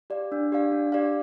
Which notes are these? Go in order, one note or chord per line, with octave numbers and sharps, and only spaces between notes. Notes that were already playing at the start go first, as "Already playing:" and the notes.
G4 D5 F5
D4
G4 D5 F5
D4
G4 D5 F5